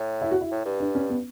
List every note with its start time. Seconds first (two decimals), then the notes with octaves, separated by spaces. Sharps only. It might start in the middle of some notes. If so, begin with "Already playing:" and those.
Already playing: A2
0.21 E4
0.31 F#4
0.41 E4
0.51 A2
0.65 G2
0.80 D4
0.95 C#4
1.10 B3